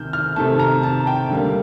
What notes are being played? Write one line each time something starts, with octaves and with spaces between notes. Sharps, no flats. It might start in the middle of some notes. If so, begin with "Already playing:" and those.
Already playing: C3 D#3 F6 G6
F6
C3 D#3 A3 A5
A#5
A5
G5
D3 G3 A#3